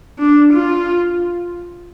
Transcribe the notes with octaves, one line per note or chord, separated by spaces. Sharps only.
D4
F4